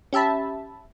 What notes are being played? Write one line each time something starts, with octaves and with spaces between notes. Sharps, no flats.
C#4 G4 E5 A5 B5